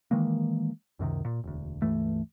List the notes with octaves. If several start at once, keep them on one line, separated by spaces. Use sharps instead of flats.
D#3 E3 G#3 A#3
C#2 F#2 C3 D#3
A#2
E1 D2
C#2 G2 E3 A3